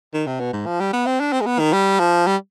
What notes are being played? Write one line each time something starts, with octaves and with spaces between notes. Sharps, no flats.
D#3
C3
B2
G#2
F3
G3
B3
C4
D4
C4
G#3
B3
D#3
G3
F3
G3